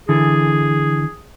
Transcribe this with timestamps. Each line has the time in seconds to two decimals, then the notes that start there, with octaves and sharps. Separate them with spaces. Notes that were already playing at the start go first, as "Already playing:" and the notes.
0.09 D3 E3 G#4